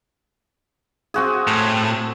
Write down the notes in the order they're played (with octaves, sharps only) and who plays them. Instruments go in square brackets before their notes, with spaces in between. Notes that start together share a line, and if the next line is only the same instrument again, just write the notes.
[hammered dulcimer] C4 F#4 G#4
[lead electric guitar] A2